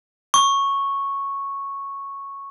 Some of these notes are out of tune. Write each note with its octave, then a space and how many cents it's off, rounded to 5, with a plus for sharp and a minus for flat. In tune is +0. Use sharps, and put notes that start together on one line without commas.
C#6 -5